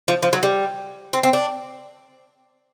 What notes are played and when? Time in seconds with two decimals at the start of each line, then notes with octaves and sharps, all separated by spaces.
0.08 F3
0.23 F3
0.33 F#3
0.43 G3
1.13 C4
1.23 C4
1.33 D4